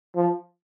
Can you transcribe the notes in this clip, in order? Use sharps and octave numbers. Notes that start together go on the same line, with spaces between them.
F3